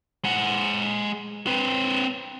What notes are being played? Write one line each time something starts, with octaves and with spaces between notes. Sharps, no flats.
G#3 F#5
C4 B4